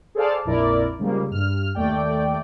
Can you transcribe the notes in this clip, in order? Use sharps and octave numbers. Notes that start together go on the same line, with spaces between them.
G#4 A4 C5 D5 F5 A5
A#1 F2 E4 A#4 D5
C#3 F3 G3 G#3 A#3
G2 F6
D#2 A3 D5 G5